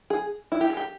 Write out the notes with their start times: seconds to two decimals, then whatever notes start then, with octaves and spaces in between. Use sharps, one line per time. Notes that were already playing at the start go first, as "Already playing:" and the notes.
0.10 G#4
0.52 E4
0.61 G4
0.70 G#4
0.77 G4